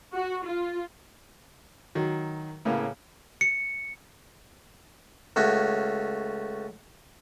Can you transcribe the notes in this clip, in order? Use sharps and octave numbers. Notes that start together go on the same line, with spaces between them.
F#4
F4
D#3 F#3
A2 C#3 A#3 B3
C#7
C#2 A3 C#4 F#4